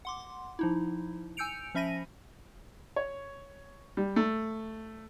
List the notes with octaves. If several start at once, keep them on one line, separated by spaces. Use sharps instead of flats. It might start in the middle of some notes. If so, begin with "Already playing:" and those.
F#5 C6 D6
F3 D#4 E4
G#5 E6 G6 C#7 D7 F7
F3 C#4 E5 B5 A#6 D#7
C#5
G3
A3